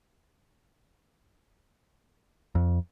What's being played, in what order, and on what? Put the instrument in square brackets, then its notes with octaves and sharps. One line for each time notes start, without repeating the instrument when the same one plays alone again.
[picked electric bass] F2